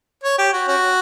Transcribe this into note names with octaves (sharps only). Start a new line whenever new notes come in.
C#5
G4
F#4
C#4 F#4